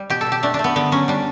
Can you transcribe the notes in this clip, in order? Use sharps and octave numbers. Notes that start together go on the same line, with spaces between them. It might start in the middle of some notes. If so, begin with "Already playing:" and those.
Already playing: G3
B2 G4
A4
B2
G4
A3 D4
D4
A3
B3
D3 B3
F#3 C#4
G3 D4